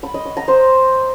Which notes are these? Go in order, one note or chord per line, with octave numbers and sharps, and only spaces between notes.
B5
D#5
C#6
A#5
C5